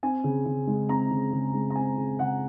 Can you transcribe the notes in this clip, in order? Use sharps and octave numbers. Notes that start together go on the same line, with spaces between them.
C4 G#5
C#3
C#3
G#3
C4 A#5
C#3
C#3
G#3
A#5
C4 G#5
C#3
C#3 F#5